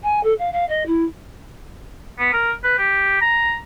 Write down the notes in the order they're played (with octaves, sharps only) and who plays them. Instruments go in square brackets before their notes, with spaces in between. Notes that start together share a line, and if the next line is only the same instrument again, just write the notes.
[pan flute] G#5
A4
F5
F5
D#5
E4
[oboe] B3
A#4
B4
G4
A#5